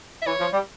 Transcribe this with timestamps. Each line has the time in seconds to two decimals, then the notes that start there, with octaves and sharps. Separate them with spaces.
0.22 E5
0.26 E3 C#5
0.40 F3
0.52 G3